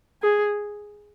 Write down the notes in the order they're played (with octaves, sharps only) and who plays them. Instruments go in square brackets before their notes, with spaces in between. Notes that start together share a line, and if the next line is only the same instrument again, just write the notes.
[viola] G#4